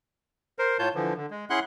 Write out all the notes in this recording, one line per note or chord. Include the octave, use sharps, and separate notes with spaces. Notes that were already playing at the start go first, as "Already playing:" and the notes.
A#4 C5
A2 F4 C#5 A5 G6
D3 E3 F3
D3
G#3
C#4 E4 G#4 F#5 C6 F#6